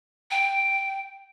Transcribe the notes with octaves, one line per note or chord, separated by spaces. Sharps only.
G5